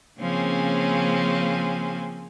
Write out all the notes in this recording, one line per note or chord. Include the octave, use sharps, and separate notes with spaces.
C#3 F3 A#3 C4 C#4 G#5